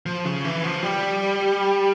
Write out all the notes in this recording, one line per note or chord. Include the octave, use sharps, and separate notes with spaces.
F3
C#3
E3
F3
G3